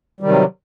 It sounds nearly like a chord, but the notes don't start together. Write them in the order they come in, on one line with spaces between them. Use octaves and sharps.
G3 D#3 C3 F#3